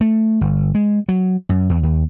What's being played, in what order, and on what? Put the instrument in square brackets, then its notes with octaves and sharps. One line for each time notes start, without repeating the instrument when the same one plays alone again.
[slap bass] A3
G1
G#3
F#3
F#2
E2
D#2